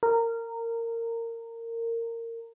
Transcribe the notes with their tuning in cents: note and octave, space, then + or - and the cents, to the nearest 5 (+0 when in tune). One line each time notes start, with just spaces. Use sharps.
A#4 -20